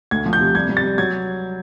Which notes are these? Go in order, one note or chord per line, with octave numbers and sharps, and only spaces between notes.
D2 G#6
F3
G6
C3
G3 G#6
G3
A6
G3
F#3 G#6